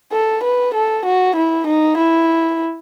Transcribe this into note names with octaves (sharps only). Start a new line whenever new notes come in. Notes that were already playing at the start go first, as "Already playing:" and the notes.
A4
B4
A4
F#4
E4
D#4
E4